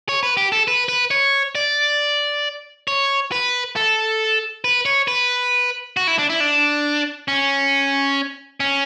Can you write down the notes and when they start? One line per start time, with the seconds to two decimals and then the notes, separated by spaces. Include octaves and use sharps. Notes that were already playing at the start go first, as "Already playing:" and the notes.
0.09 C#5
0.23 B4
0.37 G4
0.52 A4
0.68 B4
0.89 B4
1.11 C#5
1.55 D5
2.88 C#5
3.32 B4
3.76 A4
4.64 B4
4.86 C#5
5.08 B4
5.97 F#4
6.07 E4
6.18 D4
6.30 E4
6.40 D4
7.28 C#4
8.60 C#4